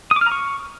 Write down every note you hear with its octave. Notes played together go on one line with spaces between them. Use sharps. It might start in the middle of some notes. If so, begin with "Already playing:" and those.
D#6
D6
F6
A#5
C#6